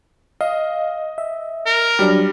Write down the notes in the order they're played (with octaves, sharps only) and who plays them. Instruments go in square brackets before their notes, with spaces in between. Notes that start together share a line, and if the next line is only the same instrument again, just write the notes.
[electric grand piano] D#5 [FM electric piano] F5
[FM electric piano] E5
[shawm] A#4
[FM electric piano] F#3 D4 [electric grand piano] G3